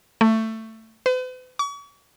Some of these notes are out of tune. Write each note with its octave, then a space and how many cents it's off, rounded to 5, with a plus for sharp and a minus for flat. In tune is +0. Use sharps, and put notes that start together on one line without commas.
A3 +15
B4 +45
C#6 +40